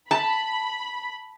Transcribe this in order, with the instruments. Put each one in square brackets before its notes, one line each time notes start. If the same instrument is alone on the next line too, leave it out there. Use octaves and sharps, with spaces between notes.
[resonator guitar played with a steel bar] A5 [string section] B5